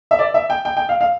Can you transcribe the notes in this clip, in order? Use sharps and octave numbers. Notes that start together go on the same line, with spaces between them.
E5
D5
E5
G5
G5
G5
F5
F5